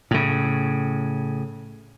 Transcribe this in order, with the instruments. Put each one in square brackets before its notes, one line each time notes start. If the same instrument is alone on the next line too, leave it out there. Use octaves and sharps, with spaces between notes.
[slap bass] A2 C#3